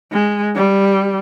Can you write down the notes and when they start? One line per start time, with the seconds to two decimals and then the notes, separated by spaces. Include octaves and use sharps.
0.12 G#3
0.56 G3